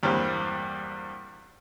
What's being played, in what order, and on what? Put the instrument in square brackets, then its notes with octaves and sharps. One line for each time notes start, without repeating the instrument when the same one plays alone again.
[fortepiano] E2 G2 G3 A#3 C4